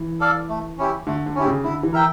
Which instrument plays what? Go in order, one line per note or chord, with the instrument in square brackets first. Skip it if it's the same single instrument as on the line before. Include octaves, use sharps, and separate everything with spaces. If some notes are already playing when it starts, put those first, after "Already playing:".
Already playing: [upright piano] E3
[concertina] A4 D5 F5
A3
C#4 E4 G4
[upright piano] D3 [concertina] A3
[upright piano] D3
[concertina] C#4 E4 G4
[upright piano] C#3
[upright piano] D3 [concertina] E4
[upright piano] E3
[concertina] A#4 E5 G5